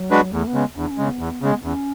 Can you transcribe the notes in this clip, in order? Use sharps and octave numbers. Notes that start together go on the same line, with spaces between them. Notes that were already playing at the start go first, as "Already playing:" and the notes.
Already playing: F#3
G#3 D4 F#4 B4
E2 A3
B3
C#3 G#3
E2 D4
C#4
C#3 G#3
B3
E2
C#3 G#3
E2 C#4